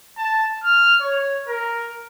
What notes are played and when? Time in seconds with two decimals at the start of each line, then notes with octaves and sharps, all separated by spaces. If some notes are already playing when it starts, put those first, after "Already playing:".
0.17 A5
0.64 F6
1.02 C#5
1.48 A#4